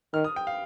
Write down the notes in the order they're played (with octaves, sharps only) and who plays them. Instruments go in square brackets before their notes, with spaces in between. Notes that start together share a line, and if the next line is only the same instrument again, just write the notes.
[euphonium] D#3 [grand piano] F6
[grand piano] D#6
G5
F5